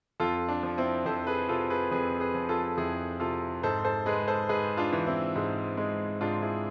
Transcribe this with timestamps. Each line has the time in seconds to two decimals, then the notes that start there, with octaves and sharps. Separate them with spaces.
0.20 F2 F4 A4
0.49 D4
0.63 F3
0.78 C4 E4
1.05 F2 A4 C5
1.27 G#4 B4
1.49 C3 F4 A4
1.70 G#4 B4
1.91 F2 G#4 B4
2.20 G#4 B4
2.35 F3
2.49 F4 A4
2.77 F2 E4 G#4
3.20 C3 F4 A4
3.63 G#2 A4 C5
3.85 A4 C5
4.06 G#3 G#4 B4
4.28 A4 C5
4.49 G#2 G#4 B4
4.77 D4 F4
4.93 E3
5.06 C4 E4
5.35 G#2
5.77 G#3
6.21 G#2 D4 F4
6.42 E4 G#4